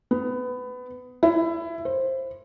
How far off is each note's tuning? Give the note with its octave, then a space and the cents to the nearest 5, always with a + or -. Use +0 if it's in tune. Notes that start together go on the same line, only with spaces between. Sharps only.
B3 +20
E4 +20
C5 +15